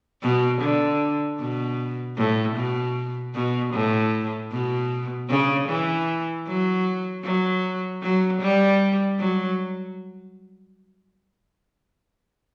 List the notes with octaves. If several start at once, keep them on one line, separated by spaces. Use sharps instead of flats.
B2
D3
B2
A2
B2
B2
A2
B2
C#3
E3
F#3
F#3
F#3
G3
F#3